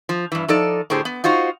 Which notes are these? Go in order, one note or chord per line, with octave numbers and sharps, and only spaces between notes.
F3
G2 E3
F3 D#4 A4 D5
A2 D3 G4 G#4 C5
B3
D#4 F4 F#4 C5